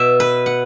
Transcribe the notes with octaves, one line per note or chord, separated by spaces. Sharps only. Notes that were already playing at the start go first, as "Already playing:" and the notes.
Already playing: B2 E5
B4
F#5